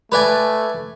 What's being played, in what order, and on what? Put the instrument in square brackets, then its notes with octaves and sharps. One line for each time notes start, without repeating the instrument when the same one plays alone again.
[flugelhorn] A3 [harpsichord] B4 D5 G#5